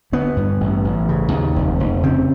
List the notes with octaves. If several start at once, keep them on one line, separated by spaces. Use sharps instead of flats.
D3 B3
G2
A1
A1
C#3
D#2
F1
F1
C#3 C4